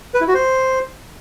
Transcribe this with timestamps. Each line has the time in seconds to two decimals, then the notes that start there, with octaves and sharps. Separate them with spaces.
0.14 B4
0.21 E4
0.28 F#4
0.34 C5